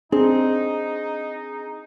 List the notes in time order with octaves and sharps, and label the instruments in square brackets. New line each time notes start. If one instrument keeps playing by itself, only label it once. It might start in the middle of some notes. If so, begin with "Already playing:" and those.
[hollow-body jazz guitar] C4 [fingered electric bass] D4 [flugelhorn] D#4 [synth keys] G#4